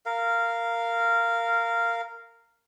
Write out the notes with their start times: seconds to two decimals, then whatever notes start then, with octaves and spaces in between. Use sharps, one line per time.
0.06 A#4 F5